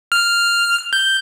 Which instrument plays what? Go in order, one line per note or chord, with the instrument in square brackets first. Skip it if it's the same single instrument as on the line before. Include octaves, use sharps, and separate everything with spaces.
[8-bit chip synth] F6
G6